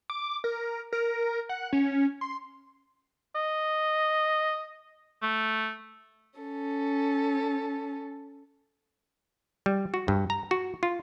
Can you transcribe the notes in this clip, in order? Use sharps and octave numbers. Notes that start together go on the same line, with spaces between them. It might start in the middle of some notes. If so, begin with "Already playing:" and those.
D6
A#4
A#4
F#5
C#4
C6
D#5
A3
C#4 A4
G3
F#4
G2
A#5
F#4
F4